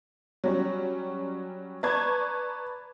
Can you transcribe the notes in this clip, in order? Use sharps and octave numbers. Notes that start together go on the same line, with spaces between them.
F#3 G3 C#4
B4 D5 A5 A#5 C#6 G#6